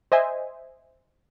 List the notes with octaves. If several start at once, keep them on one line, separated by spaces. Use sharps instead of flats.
C5 D#5 E5 G#5